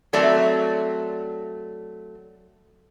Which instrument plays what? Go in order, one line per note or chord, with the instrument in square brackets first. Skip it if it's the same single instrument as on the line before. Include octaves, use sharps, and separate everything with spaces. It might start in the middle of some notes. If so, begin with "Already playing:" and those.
[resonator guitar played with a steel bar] F#3 A3 C4 D5 A5 A#5